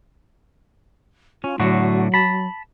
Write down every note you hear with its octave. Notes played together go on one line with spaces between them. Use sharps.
C#4 F4
A2 D3 F#3 F#4
A5 B5